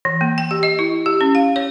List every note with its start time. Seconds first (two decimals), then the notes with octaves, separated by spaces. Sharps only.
0.05 E3
0.21 A#3
0.38 G5
0.51 G4
0.63 D#5
0.79 E4
1.06 G4
1.21 C#4
1.35 F5
1.56 C#5